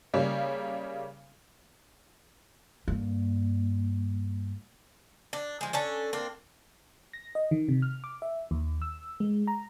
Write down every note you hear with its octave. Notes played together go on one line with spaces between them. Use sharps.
C#3 G3 A#3 C#4
G2 A#3
D4
F3 G#3
C#4 D4 A4
A#3 C4 D4
A#6
D#5
D#3
C3
F6
D6
E5
D#2
E6
G#3
A#5